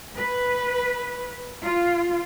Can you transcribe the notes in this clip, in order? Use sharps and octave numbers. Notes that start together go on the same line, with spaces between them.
B4
F4